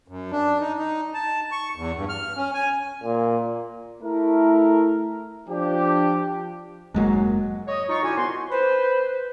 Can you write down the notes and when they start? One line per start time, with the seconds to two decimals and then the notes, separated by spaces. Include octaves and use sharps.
0.08 F#2
0.31 D4
0.60 D#4
0.78 D#4
1.14 A5
1.52 C#6
1.76 E2
1.96 G2
2.09 F6
2.37 C#4
2.54 G#5
3.03 A#2
4.03 A3 E4 A#4
5.49 F3 D4 G4
6.94 F1 G#2 F#3 G#3 A#3
7.68 C#5 D#5
7.89 D#4 F4 C#6
8.03 D3 E4 F#4 G4 G#5
8.16 C2 B3 F4 F#4 C6
8.51 B4 C5